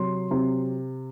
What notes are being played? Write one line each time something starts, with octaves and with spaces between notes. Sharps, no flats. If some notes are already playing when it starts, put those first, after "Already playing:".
Already playing: C3 F#3 C6
C3